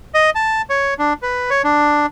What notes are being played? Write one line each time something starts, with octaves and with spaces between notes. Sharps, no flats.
D#5
A5
C#5
D4
B4
C#5
D4